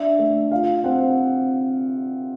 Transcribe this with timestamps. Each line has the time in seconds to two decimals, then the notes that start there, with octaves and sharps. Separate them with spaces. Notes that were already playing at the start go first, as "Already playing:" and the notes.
Already playing: D4 E5
0.19 A3
0.51 F4 F5
0.84 C4 F#5